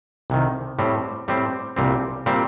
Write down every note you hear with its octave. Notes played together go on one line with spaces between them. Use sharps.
C2 C3 D#3
A2 G3 C4
A2 G3 C4
C2 A#2 G3 C4
A#2 G3 C4